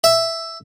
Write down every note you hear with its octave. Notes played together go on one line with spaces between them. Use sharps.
E5